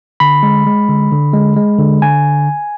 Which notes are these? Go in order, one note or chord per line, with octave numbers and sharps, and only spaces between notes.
D3 B5
G#3
G#3
D3
D3
G#3
G#3
D3
D3 G#5